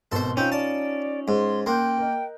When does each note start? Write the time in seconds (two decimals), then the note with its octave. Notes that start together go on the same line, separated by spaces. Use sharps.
0.12 G#1 B2 A4 C5 C6
0.37 C4 C#4 D#4 F4 G6
0.52 D5 A5
1.28 G#2 C6
1.66 A#3 G5 C6 F#6 G6
1.98 A#4 D#5